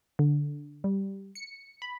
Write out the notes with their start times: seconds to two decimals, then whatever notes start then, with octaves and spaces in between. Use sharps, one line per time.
0.19 D3
0.84 G3
1.35 C#7
1.82 B5